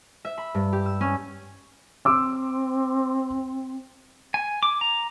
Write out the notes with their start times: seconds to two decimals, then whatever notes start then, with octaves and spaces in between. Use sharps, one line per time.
0.25 E5
0.38 B5
0.55 G2
0.73 G4
0.86 E6
1.01 C#4
2.05 C4 C6 D6 E6
4.34 G#5
4.63 D6
4.81 A#5